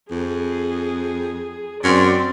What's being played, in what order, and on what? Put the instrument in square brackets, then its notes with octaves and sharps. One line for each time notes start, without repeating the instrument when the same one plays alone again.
[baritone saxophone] F2 [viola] G#4
[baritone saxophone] F#2 [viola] C4 D5